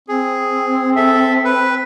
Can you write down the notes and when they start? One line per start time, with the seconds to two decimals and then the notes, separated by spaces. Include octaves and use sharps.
0.08 C4 G#4
0.96 A4 E5
1.45 B4